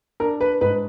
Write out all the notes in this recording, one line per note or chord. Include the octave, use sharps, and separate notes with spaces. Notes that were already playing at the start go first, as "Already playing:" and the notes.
D4 A#4
B4
G#2 B4